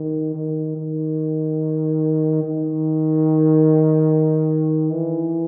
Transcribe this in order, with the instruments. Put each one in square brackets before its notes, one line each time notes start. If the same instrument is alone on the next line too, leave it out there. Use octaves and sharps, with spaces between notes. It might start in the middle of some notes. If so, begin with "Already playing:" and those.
Already playing: [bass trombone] D#3
D#3
D#3
D#3
E3